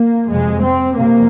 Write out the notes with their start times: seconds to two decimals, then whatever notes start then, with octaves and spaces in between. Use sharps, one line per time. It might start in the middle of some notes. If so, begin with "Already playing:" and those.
Already playing: A#3
0.30 F2 C3 G#3
0.63 C4
0.96 F2 C3 A#3